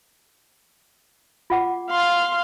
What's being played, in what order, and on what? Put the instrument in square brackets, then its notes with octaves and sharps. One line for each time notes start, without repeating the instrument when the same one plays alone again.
[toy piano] F4 F#5 D6
[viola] F5 C6